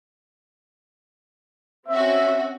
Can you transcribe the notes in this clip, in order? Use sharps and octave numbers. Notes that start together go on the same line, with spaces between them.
C4 C#4 F#4 E5